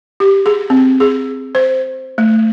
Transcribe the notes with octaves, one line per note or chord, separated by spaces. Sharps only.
G4
G#4
C4
G#4
C5
A3